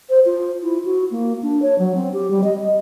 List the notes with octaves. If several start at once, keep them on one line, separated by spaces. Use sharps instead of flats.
C5
F4
E4
F#4
A#3
D4
C#5
F#3
C4
G4
G3
D#5